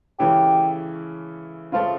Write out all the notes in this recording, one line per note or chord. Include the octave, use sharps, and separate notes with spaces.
C#3 E3 A3 C#4 G4
C#3 F3 A3 F4